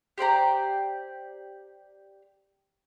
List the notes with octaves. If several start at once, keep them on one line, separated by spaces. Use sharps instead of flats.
G4 C5 D5 A#5